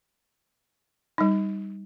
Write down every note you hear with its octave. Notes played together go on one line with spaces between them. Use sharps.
G3 D#4